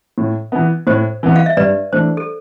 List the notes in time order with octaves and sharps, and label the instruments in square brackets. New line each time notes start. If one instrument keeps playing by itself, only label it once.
[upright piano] A2
E3 B3
[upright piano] A2 [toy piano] C5
[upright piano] E3 B3
[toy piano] F5
E5
[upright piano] G2 [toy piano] B4 D5
[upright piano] E3 A3 D4 [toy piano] C5
[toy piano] A4